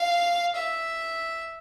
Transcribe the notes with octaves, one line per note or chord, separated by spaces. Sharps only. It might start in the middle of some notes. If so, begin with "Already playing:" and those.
Already playing: F5
E5